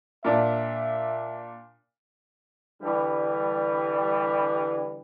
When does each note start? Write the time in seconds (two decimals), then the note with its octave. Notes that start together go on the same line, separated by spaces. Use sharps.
0.24 A#2 D4 E5
2.82 D3 E3 G3